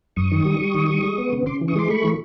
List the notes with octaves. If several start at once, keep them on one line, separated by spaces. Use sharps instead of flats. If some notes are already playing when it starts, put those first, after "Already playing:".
F#2 C#6 D#6
D#3
G3
G3
D#3
G3
G#3
B3
C#3
C#3 C6 D6
E3
C#6 D#6
G#3 C6 D6
A3 B5 C#6
E3